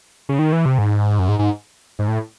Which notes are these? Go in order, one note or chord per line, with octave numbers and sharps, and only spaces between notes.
C#3
D#3
E3
C3
G#2
F#2
G#2
G#2
G#2
A2